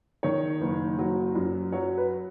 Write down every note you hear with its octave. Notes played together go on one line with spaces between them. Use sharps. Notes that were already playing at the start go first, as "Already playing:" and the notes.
D#3 C#5
F#1
F#3
F#2
F#3 C#5
B4